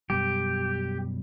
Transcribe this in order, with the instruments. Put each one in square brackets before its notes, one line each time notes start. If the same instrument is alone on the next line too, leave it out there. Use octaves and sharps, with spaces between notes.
[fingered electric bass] F#2 B2 G3 [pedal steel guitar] G4